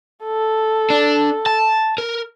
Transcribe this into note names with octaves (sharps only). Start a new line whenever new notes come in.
A4
D4
A5
A#4